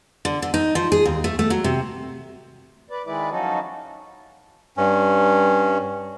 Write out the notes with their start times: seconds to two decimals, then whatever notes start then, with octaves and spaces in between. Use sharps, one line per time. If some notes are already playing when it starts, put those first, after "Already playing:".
0.25 D3
0.42 D3
0.54 D#4
0.75 F3
0.92 G#4
1.05 D#2
1.24 A3
1.39 A3
1.50 F#3
1.64 C3
2.91 B4 D5
3.06 D#3 G#3 E4 B4 D5
3.30 F3 F#3 C#4 D#4 F#4 A4
4.77 G2 C#4